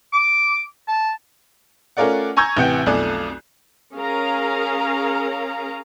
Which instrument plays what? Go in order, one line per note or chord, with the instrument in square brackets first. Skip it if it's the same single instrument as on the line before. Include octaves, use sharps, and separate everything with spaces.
[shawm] D6
A5
[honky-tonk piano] A3 C#4 F4 A#4 D5 F#5
G#5 A#5 C#6 E6 G6 G#6
A1 C3 E3 F#5 G5 G6
B1 F2 A3 D5 G#5 F#6
[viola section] C#4 G#4 A#4 F5 A#5